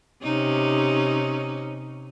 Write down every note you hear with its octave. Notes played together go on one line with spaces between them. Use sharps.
C3 C#4 D#4